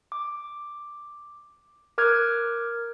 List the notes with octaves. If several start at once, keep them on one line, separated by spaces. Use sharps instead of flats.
D6
A#4 D6 F6 F#6 G#6